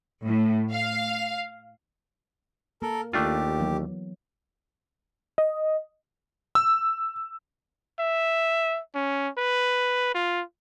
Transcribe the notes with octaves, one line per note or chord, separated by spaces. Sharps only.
A2
F5
A#3 A4 A#4
D#2 A3 D4 F4 G4
E3 F#3 B3
D#5
E6
E5
C#4
B4
F4